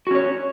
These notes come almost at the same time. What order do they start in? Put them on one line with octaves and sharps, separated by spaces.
F#4 C#4 C#5